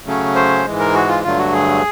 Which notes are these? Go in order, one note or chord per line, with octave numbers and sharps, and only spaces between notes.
C#3 F#3 A3 C#4
C5
G#2 E3 G#3
A#4
F#4
F4
G2 D3 F#3 A3 F4
F#4
G#4